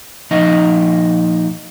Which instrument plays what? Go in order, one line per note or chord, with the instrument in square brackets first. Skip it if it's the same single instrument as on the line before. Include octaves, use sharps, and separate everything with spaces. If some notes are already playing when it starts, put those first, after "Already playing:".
[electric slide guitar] A#2 F3 D#4 D#5